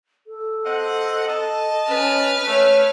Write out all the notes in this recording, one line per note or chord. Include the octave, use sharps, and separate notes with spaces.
A4
C4 D#5 F#5
D#5 A5
C#4 B4 F6
A3 C#5